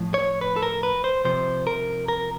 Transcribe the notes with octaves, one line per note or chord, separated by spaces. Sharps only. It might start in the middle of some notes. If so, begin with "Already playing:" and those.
Already playing: A2 F3
C#5
B4
A4
A#4
B4
C5
C3 F3 C5
A#4
A#4